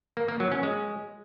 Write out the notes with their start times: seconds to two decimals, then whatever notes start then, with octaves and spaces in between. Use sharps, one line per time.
0.17 A#3
0.28 A#3
0.40 F#3
0.52 C#4
0.63 G#3